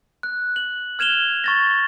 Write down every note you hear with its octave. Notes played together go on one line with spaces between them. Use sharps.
F#6
F#7
F6 G#6 E7 F7 G7
C#6 A6 A#6